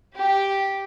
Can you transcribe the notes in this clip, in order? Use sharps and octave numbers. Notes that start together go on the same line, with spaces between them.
G4